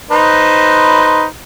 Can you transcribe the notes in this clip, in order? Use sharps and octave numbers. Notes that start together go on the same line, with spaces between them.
D#4 B4 C5